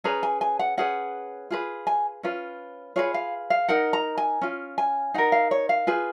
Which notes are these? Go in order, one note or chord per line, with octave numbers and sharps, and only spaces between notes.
C#4 G#4 B4 A#5
G#5
G#5
F#5
C#4 G#4 B4 F#5
F4 G#4 B4
G#5
C#4 F4 B4
F4 G#4 B4 C#5
F5
F5
D#4 A#4 F#5
A#5
G#5
C#4 F4
G#5
D#4 A#4 F#5
F5
C#5
F5
F4 G#4 B4 G#5